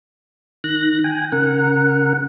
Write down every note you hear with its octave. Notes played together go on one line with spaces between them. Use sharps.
D#3 F#6 A#6
G5 G#5
C#3 A#4 F#5